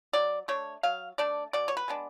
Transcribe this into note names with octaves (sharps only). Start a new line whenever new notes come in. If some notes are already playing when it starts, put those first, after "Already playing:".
F#3 D5
A3 D4 C#5
F#3 F5
A3 D4 D5
B2 D5
C#5
B4
G#3 B3 D4